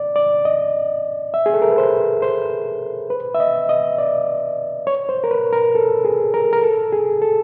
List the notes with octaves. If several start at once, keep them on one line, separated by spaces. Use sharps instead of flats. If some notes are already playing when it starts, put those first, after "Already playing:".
Already playing: D5
D5
D#5
E5
G#4
A4
A#4
B4
C5
C5
B4
E5
D#5
D#5
D5
C#5
C5
A#4
B4
A#4
A4
G#4
A#4
A#4
A4
G#4
A4